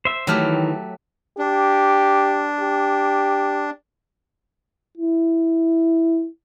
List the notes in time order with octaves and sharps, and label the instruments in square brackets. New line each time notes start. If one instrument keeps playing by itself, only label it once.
[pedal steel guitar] C5 E5
[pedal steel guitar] D#3 E3 F6 [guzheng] F#3 A3 G4
[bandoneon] D4 [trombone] G4
[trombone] G4
[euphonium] E4